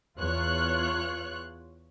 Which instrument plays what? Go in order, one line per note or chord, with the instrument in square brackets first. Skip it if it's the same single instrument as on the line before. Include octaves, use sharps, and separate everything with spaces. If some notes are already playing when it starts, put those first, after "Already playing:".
[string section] E2 F4 C#5 F#6